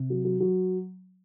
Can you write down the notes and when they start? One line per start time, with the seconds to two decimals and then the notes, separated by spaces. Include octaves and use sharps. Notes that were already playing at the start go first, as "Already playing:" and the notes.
Already playing: C3
0.10 F#3
0.25 F#3
0.40 F#3